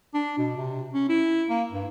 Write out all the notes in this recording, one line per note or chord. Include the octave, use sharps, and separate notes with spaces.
D4
B2
C3
C#4
E4
A#3
G2